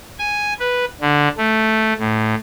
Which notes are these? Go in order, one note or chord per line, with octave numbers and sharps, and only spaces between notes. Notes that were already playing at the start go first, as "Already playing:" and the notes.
G#5
B4
D3
A3
A2